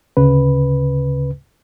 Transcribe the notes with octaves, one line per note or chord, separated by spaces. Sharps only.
D2 C#3 B4